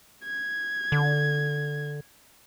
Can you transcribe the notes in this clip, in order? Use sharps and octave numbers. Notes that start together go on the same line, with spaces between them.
G#6
D3